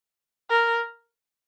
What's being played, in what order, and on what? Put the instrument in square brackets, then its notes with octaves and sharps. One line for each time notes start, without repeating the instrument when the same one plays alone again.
[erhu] A#4